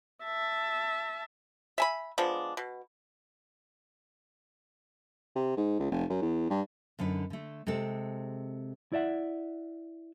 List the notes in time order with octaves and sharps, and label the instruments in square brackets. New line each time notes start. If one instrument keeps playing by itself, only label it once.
[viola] E5 A5
[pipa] E5 G#5 B5
F3 G#3 B3 D4
B2
[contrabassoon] C3
G#2
C#2
F1
F#2
E2
G2
[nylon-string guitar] F#2 D3 D#4 B4
D3 A3
C3 G#3 C4 A4
[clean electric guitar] E4 D5 E5 F#5